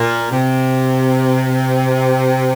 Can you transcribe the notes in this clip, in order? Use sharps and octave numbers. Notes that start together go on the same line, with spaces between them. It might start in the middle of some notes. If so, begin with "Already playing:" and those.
Already playing: A#2
C3